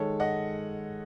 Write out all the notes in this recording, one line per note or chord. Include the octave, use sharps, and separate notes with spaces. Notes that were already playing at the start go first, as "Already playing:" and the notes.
Already playing: D#3 G#3 A4 C#5
D#5 F#5